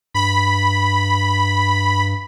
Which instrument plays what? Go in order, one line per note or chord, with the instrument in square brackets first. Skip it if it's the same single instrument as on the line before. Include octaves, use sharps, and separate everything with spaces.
[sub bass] G2 [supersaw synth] B5